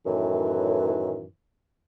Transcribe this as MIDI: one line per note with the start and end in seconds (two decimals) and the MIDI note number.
0.06 1.25 42
0.06 1.25 45
0.06 1.25 51
0.06 1.25 52